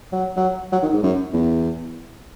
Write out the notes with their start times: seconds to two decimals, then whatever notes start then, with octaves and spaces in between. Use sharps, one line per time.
0.13 F#3
0.37 F#3
0.73 F#3
0.83 D#3
0.93 G#2
1.03 F#2
1.33 E2